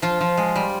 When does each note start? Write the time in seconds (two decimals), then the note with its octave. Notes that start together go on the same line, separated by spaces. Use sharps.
0.02 F3 F4
0.21 F3
0.37 G#3
0.56 G3